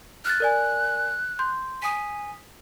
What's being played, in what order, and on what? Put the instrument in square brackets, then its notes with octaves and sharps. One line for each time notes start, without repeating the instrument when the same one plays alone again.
[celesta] F6 A6 [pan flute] F#6
[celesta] A#4 D5 G#5
C6 G6
[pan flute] G#5 [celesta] D#6 B6